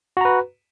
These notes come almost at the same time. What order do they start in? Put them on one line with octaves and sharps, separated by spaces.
F#4 A#5 B4